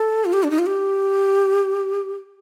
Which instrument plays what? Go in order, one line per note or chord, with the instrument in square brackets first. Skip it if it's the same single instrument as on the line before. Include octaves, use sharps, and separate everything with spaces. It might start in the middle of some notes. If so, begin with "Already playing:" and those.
Already playing: [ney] A4
F4
G4
D4
D#4
F4
G4